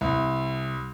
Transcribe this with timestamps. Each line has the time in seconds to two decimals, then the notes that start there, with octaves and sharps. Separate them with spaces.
0.01 C2